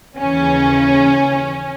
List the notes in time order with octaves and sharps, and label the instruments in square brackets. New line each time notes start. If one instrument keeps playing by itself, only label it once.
[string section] D#2 C#3 E3 C#4